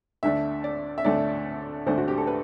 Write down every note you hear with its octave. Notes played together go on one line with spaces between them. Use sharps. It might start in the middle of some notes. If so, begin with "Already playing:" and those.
D2 D3 A3 D4 E5
D5
E5
D2 D3 A3 D4 D5
D2 D3 A3 D4 C5
F#4
G4
A4
B4